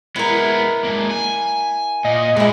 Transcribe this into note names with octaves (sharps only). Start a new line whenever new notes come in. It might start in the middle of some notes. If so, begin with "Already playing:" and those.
G#3 B3 E4 A#4
G#3 A#3
G#5
A#2 D#5
A#2 G#3 D#4 E4